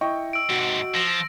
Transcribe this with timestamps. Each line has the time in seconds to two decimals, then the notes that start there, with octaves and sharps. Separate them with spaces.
0.01 E4 D#5 G5 C#6
0.33 E6 D7
0.49 G#2 C3 F#4
0.95 F3 A#6